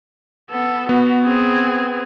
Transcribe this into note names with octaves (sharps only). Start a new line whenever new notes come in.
B3 A4
B3 F#4
C4 G#4